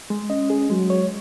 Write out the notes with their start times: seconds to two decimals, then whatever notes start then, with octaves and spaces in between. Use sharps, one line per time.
0.10 G#3
0.30 C#4 D#5
0.50 G#4
0.70 F#3 G#3
0.90 C#5